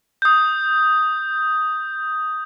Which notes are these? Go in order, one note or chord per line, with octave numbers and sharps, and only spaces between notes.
D#6 G6